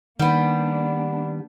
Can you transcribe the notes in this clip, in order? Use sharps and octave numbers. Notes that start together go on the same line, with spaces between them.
D#3 G3 A#3 B3 D4 F#5 B5